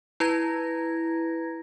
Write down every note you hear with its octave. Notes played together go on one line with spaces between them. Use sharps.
E4 B4 A#5 G#6 A#6